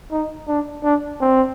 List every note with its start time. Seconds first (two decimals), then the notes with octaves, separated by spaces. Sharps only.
0.11 D#4
0.48 D4
0.84 D4
1.21 C4